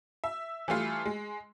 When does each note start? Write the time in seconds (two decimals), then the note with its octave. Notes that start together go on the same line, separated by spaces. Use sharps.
0.24 E5
0.68 E3 G3 A3 F4
1.06 G#3